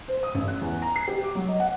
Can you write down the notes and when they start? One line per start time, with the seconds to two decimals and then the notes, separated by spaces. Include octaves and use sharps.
0.08 C5
0.23 D#6
0.34 A1
0.48 F#6
0.61 E2
0.82 A#5
0.96 C7
1.08 G4
1.23 D6
1.35 F#3
1.48 D#5
1.60 F#5